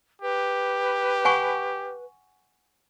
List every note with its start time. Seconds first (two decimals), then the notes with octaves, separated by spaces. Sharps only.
0.22 G4 B4
1.25 F#5 G#5 C#6